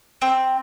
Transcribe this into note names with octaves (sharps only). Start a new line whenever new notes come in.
C4